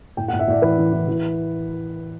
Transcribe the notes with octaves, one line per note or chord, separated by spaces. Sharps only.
A2 G5
F#5
A2
E5
A2 D5
E3 B4
E3
E3
E3